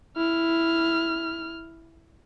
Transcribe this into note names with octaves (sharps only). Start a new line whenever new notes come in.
E4 F6